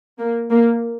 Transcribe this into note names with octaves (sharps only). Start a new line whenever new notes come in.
A#3
A#3